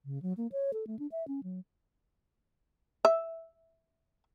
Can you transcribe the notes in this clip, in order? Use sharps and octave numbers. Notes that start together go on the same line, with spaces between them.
C#3
F#3
A#3
C#5
A4
A3
D4
E5
C#4
F#3
E5